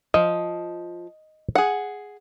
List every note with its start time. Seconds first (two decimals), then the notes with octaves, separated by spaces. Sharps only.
0.14 F3 D#5
1.55 G#4 F#5